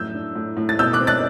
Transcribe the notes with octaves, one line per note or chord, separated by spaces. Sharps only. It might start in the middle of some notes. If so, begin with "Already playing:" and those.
Already playing: F#2 A2 E6 G6
D4
A2
A2
A6
B2 E6 G6
D6 F#6
C4
F#6 A6